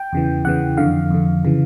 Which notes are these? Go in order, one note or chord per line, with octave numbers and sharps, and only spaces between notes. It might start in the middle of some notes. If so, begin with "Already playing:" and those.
Already playing: G5
E2 C#3 E3
E2 C#3 E3 F#5
F2 D3 F5
F2 D3
C#3 E3